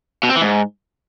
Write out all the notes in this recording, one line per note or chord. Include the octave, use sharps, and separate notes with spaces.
B2
C4
E3
G#2